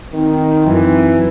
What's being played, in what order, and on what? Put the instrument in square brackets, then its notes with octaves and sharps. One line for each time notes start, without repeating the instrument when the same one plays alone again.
[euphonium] D#3 [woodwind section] C4 D#4
[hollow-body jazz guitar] F#2 [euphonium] E3